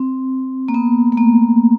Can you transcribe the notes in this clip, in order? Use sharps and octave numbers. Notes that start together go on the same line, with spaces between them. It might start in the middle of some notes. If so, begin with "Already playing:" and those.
Already playing: C4
A#3
B3
A3
A#3